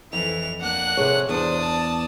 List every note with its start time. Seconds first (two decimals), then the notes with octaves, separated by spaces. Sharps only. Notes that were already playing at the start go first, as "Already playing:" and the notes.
0.13 F2 E3 F7
0.60 A#3 D4 F#5 F#6
0.97 C3 G#4 C#5
1.29 E2 D4 C5 D5 D#6
1.60 A5